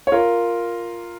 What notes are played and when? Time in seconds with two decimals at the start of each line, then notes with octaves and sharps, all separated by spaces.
0.07 C#5
0.12 F4 A#4